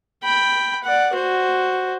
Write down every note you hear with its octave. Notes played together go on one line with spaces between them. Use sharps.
G5 B5
D5 F#5
F#4 C5